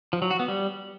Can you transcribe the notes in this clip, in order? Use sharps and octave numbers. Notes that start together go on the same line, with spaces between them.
F3
F#3
F#4
B3
G3